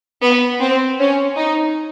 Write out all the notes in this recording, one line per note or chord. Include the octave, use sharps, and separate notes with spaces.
B3
C4
C#4
D#4